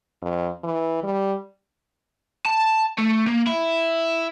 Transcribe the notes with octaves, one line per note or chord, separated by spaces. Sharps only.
F2
E3
G3
A5
A3
A#3
E4